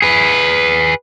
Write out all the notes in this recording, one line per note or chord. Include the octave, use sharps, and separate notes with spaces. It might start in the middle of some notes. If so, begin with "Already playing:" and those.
G#4 B4